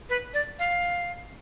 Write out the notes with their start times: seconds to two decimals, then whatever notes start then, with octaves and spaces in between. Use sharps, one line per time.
0.09 B4
0.34 D5
0.59 F5